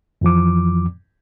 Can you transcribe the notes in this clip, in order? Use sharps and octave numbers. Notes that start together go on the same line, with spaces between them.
F2 E3 F3 D6